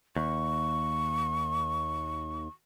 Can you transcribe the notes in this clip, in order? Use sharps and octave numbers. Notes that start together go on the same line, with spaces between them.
D#2 C#6